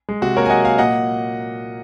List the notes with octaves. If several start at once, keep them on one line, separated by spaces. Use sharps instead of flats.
G#3
C3 F#4
A#3 A#4 C#5
G#5
F#3 D#5 F#5
A#3 F5 G#5
A#2 D#5 F#5